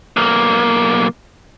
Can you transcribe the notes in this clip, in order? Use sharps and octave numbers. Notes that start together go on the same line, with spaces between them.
B1 A#3